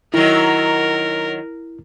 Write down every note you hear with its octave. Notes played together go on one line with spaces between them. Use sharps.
D#3 F#3 E4 A#4